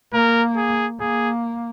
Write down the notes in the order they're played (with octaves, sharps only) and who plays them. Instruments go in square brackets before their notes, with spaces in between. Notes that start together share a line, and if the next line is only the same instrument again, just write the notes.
[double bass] A#3 [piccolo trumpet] A#4
[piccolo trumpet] G#4
[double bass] A#3 [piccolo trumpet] G#4